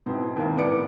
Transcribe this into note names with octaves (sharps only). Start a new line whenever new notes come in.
G#2 B2 C4 E4
D#2 A#3
A2 B3 D5 D6 C#7 D7